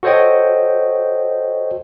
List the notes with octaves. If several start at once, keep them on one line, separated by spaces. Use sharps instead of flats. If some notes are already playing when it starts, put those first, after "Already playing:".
F#4 A4 C5 C#5 D#5 G5